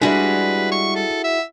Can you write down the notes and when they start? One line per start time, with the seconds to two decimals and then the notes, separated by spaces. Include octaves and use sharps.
0.01 G3 G#3 D4 E4 F#4 G#4 B4
0.72 C#6
0.95 A4
1.24 E5